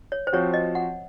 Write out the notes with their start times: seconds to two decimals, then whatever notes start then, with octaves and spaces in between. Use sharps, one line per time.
0.12 C#5
0.27 C5
0.33 F3 C4 F#4 C#5
0.54 D#5
0.75 F#5